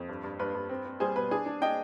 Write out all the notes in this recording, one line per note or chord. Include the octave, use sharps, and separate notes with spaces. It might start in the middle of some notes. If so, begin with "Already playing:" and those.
Already playing: F2
G2
G2
G2 B4
G2
C4
C4
G3 G#4 C5
B2 B4
D4 G#4
D4
D4 D#5 G5